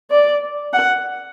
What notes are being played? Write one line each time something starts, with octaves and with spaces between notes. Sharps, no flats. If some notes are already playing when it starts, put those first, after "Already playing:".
D5
F#5